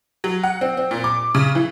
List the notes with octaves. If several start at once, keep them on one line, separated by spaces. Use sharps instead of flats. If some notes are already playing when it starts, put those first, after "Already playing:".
F#3
F#5
C4
C4
A#2
D6
C#3
E3